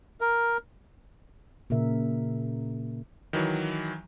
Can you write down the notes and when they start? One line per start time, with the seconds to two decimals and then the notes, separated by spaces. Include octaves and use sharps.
0.21 A#4
1.70 A#2 C#3 A#4 E5
3.33 D#3 E3 F#3